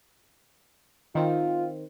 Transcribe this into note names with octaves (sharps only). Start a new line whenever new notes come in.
D#3 C4 F4